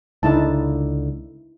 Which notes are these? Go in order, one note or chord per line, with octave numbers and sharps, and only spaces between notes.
C#2 D3 D#4 E4 A5